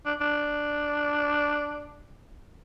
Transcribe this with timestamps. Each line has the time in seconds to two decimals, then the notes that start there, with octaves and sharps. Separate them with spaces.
0.06 D4
0.21 D4